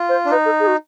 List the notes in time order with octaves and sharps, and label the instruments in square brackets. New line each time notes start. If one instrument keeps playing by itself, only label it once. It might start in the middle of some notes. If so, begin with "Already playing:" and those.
Already playing: [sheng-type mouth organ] F4
[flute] C5
[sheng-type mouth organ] D4
[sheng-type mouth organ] D#4 [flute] B4
[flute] A4
G#4
F#4